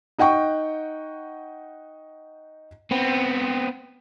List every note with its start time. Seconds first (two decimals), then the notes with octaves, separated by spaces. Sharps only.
0.18 D#4 D#5 F#5 G5 C#6
2.91 B3 C4